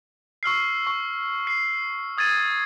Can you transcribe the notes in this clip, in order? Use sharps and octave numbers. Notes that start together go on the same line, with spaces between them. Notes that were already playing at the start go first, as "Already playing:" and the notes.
C#6 E6 F6 C7
C#6
C7
D#6 G#6 A6 D#7